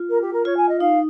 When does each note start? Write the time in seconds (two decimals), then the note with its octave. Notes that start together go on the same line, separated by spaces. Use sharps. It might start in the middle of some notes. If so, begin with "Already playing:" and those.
Already playing: F4
0.10 A#4
0.21 G4
0.33 A#4
0.45 F4 C#5
0.57 G#5
0.69 D#5
0.80 D#4 F5